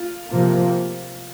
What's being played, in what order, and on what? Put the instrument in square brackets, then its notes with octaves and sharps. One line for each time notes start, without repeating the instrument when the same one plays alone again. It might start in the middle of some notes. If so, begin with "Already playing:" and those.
Already playing: [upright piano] F4
[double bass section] C3 F3 A#3